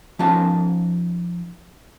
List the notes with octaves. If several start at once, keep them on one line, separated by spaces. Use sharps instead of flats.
F3 C#4 D#4 F4 A5